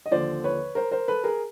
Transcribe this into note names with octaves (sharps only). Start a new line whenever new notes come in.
D#5
D#2 D3 F3 C5 D5
B4 C#5
A#4 C5
A#4 C5
A4 B4
G#4 A#4